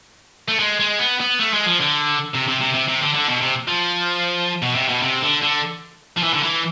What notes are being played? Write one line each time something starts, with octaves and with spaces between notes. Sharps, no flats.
A3
G#3
G#3
B3
B3
A3
G#3
F3
D3
C3
C3
C3
C3
C3
D3
D3
B2
C3
F3
B2
C3
B2
C3
D3
D3
F3
E3
D3
E3